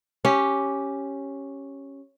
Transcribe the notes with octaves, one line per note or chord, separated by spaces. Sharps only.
C#4 G4